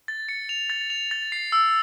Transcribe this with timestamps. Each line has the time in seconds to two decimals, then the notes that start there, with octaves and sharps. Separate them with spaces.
0.08 A6
0.29 C#7
0.49 F7
0.70 A6
0.90 F7
1.11 A6
1.32 C7
1.52 E6